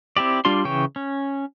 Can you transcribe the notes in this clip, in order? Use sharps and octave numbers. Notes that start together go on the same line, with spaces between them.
C4 E4 G4 D5
G3 D4 F4 D5 C6
C#3 E3 C#5 G5
C#4